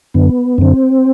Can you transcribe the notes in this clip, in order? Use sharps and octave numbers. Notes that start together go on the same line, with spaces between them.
F#2 D3 B3
F#2 D3 C4